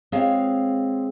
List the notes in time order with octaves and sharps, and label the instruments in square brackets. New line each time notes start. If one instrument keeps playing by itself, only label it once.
[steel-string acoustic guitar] G#3 C4 F4 G#4 C#5 F5